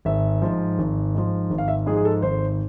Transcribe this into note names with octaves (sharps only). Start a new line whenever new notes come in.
G#1 E5
G#2 F3
G#1
G#2 F3
G#1
F5
E5
G#2 F3 G#4
G#4
A4
G#1 C5